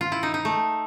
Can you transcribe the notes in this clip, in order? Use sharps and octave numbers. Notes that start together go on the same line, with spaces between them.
F4
E4
D#4
D#4
A3